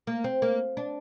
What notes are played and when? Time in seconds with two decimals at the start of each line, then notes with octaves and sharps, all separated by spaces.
0.07 A#3
0.24 C4
0.42 A#3
0.77 D4